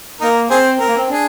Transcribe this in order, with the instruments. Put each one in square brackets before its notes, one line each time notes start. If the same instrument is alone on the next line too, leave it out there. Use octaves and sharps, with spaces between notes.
[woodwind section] A#3 [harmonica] D#4 A#4
[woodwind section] C4 [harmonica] G#4 C5
[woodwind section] C4 [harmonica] A#4
[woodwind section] A#3
C4
[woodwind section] D4 [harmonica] G#4